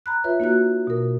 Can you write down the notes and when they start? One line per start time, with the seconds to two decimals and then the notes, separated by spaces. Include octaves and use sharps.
0.06 A#5 B5 F#6
0.24 F4 B4 C#5 E5
0.40 A#3 D#4 F#4 F#6
0.87 B2 A#4